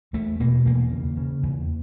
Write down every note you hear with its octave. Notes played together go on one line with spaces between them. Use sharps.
E2 A3
B2 A#3
E2 A#3
C#3
C#3
E2